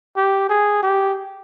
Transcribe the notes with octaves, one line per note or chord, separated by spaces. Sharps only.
G4
G#4
G4